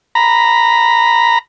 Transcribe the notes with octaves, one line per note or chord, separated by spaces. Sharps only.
A#5 B5